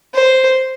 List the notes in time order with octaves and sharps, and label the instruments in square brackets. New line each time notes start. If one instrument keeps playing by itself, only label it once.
[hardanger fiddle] C5